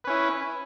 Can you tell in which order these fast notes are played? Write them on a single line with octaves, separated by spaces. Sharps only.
B4 C#4 E4